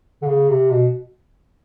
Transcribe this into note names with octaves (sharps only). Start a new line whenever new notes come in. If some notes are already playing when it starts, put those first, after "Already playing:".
D3
C#3
C3
B2